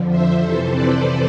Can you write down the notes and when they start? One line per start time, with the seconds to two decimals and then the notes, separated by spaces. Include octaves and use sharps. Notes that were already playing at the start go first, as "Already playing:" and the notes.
Already playing: F2 D3 F3
0.09 C5 E5
0.41 F2 C3 E3 A4 C5
0.73 B4 D5